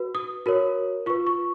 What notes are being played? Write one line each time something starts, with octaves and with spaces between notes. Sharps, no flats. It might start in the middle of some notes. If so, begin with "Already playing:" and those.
Already playing: F#4 B4
D#6
F#4 A#4 C#5
F4 B4 C#6
C#6